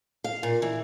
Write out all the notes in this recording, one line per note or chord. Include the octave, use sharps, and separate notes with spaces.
F5
A#2
E3